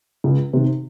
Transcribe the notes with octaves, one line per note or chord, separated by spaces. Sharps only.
C#2
C3 D#3